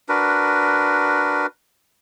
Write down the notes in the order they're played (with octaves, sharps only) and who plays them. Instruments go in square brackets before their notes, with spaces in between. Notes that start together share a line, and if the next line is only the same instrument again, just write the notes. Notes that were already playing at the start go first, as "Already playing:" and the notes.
[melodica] D4 F#4 A#4 B4